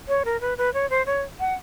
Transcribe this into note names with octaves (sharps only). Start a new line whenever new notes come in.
C#5
A#4
B4
B4
C#5
C5
C#5
F#5